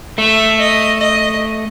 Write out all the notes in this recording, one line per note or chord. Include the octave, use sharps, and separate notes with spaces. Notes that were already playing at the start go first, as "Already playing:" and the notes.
A3 E5
D#5
D#5